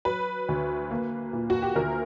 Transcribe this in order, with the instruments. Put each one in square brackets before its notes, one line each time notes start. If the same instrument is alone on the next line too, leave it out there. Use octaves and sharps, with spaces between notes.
[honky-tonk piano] F#3 B4
D2
A#3
A#2
F#4
G4
D2 A#4